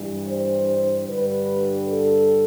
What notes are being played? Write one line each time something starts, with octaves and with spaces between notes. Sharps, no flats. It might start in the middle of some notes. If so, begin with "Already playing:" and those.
Already playing: G2 E3 G3
C5
G2 D3 G3 B4
A4